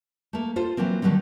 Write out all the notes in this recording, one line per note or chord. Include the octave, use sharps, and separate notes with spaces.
A3 A#3
F4 A4 C5
E3 F#3 A#3 C4
D3 D#3 F#3 G3 C4